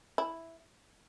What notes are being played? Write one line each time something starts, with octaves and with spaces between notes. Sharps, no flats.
E4